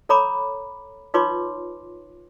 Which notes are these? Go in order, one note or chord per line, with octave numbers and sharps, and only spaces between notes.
A4 C#5 A#5 B5 D6
D#4 F4 B4 C#5 C6 D6